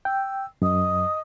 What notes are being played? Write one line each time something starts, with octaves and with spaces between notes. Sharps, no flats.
G5 E6
F#2 D#5 D#6